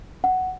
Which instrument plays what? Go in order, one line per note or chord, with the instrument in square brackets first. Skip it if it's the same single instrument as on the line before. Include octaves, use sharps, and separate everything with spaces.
[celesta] F#5